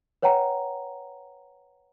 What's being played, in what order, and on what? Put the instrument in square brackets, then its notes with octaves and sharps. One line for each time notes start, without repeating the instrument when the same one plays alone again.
[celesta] B4 C#5 F#5 G5 A#5